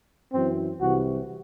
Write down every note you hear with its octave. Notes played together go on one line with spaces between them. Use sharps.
F#2 E3 C4
C2 C3 E3 F#4